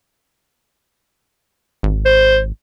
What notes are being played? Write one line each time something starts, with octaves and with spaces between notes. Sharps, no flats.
G#1
C5